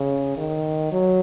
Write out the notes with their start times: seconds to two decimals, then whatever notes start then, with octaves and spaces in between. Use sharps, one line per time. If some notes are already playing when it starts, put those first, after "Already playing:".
Already playing: C#3
0.37 D#3
0.92 F#3